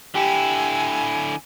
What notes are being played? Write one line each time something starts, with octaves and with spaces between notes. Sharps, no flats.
D3 E4 G4 G#5